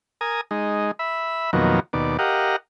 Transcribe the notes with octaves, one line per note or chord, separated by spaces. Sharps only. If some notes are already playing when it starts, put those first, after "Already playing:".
A#4 G#5 D#6
G#3 D#4
E5 B5
F2 B2 D#3 F#3 A#3
D#2 B2 D5
G4 A#4 D#5 F5 F#5